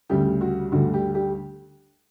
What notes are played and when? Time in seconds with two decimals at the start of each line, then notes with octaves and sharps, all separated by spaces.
0.10 D2 C#3 G3 G4
0.41 F#4
0.72 D2 D3 G3 F#4
0.94 G4
1.15 G4